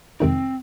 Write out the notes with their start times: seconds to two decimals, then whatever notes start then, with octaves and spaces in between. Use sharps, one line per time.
0.20 F2 C3 D#3 G#3 C4 D#4